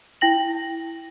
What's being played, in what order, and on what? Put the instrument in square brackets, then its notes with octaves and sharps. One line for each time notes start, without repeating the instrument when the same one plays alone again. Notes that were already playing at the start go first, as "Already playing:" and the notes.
[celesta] E4 G5 A#6 F#7